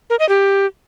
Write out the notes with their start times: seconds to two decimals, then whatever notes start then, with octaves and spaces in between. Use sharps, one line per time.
0.10 A#4
0.19 D#5
0.29 G4